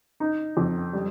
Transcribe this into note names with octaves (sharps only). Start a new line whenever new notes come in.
D#4
F2
G3